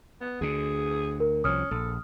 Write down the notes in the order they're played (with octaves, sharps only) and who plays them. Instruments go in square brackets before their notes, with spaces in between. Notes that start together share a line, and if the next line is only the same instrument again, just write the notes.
[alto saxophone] B3
[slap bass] D2 D3 [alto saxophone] G#4
[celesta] A#4
[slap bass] C2 F3 [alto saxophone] C#4 [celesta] D#6 F6
[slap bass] A#1 [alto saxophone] A4